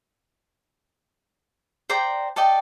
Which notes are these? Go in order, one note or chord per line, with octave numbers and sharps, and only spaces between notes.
C5 D5 G5 A#5
A4 D5 D#5 G5